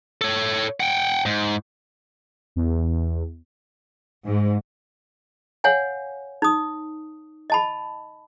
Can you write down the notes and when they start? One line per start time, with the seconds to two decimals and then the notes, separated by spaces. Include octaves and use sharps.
0.21 A4 C#5
0.80 F#5 G5
1.26 G#2
2.56 E2
4.26 G#2
5.64 C#5 F5 F#5 G#5
6.42 D#4 D#6
7.50 D#5 A5 B5